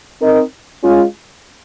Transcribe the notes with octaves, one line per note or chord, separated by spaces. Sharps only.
C4 D#4 A#4 D#5
G#3 C#4 F4